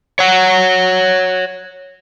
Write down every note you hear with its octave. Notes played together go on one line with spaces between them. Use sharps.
C#5 F#5